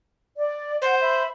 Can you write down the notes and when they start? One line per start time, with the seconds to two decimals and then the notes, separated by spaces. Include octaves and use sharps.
0.37 D5
0.82 C5 F#5
1.01 E5 B5